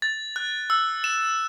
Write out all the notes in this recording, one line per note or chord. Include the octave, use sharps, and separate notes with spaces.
A6
F#6
E6
E7